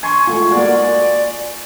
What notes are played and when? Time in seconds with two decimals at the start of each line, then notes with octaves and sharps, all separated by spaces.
0.03 G#5 C6 C#6
0.27 G#3 A3 F4
0.52 A#3 F#4 D5